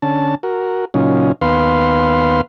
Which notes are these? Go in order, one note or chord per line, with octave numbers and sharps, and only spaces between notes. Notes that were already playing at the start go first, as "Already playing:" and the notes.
D3 C#4 A5
F#4 A#4
A#2 C#3 F#3 C#4 D#4 F4
D#2 B3 B4 F5 C6